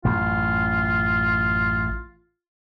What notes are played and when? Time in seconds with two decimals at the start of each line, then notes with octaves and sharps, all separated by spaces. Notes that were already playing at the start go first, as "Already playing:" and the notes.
0.05 A1 F#2 F4